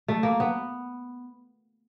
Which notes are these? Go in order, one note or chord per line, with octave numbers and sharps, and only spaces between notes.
A3
A#3
B3